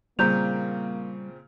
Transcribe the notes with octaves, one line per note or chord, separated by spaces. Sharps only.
A#2 C#3 G3 A#3 C4 A#5 G6 F7